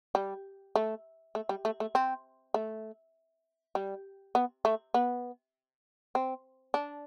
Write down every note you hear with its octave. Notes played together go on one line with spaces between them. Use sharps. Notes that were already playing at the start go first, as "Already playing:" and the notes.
G3
A3
A3
G3
A3
A3
C4
A3
G3
B3
A3
B3
C4
D4